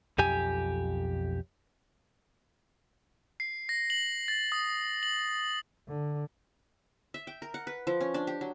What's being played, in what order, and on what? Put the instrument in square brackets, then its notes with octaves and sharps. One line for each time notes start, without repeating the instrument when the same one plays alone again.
[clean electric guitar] B1 F2 G4 G#5
[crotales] C7
A#6
F#7
A6
D#6
F#7
[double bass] D3
[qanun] E5
G5
A#4
F#5
B4
F3
C#4
D4
G4
F#3